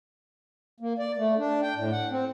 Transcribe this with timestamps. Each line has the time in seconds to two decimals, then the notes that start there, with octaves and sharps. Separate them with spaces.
0.80 A#3
0.99 D5
1.17 A3
1.38 D4
1.62 G5
1.76 A2
1.92 F#5
2.11 C4